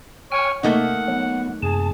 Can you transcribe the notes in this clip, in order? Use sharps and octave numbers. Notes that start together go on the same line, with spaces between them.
C#5 G5 G#5 F6
C3 A3 A#3 D#4 F#5
F#3 B3
F#2 C3 G#4 A5